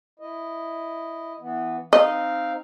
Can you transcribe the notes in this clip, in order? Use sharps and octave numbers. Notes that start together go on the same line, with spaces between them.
E4 D#5
E3 B3
C4 D#4 D#5 F5